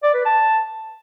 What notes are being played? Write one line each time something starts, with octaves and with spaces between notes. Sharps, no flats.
D5
B4
A5